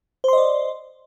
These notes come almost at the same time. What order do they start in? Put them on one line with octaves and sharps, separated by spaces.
C5 C6 D#5 D5